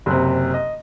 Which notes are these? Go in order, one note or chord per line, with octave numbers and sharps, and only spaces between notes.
F#1 C3
D#5